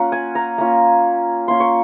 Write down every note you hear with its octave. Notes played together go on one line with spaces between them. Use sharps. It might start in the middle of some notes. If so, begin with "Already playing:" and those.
Already playing: A#3 C#4 F4 F#5
G#5
A#5
A#3 C#4 F4
A#3 C#4 F4 C6
C#6